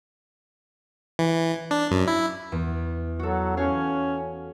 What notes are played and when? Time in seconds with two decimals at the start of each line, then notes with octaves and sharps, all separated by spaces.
1.19 E3
1.71 D4
1.91 F#2
2.08 E4
2.52 E2
3.19 F#3 F#4 A4
3.57 C#4 F#4 C#5 F5